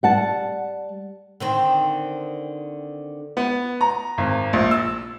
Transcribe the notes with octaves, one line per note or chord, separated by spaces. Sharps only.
G3 F#5 A5
D3 D#3 C4
B3
A#5
G#1
A#1
E6